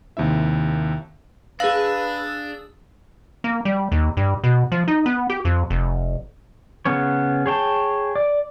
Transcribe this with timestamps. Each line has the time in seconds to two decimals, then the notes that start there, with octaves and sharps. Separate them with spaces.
0.17 D#2 C3 E4 E5
1.60 D4 G#4 B4 F5 E6
3.44 A#3
3.65 G3
3.92 D#2
4.17 G2
4.44 B2
4.72 F3
4.88 D#4
5.06 B3
5.30 G4
5.45 F2
5.70 F1
6.85 C#3 B3 C#4 C#5
7.46 G#4 C#5 G5 A5
8.16 D5